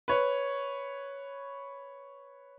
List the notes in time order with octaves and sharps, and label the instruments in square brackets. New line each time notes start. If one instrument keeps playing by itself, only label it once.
[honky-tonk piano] B4 C#5